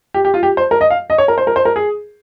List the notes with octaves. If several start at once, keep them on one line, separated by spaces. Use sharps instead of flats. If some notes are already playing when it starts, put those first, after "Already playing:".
G4
G4
F4
G4
C5
A#4
D#5
F5
D#5
C#5
A#4
C5
A#4
C5
A#4
G#4